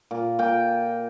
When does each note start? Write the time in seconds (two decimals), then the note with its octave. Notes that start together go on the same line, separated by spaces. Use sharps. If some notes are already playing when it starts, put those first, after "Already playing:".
0.11 A#2
0.39 A#2 G5